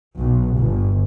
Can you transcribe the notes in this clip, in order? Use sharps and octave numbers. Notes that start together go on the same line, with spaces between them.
B1
G1